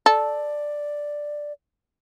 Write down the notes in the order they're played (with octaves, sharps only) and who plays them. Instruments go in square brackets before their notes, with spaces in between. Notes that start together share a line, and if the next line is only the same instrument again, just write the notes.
[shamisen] A4 [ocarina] D5